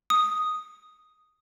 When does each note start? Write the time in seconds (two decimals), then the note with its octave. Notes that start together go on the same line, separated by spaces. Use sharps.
0.10 D#6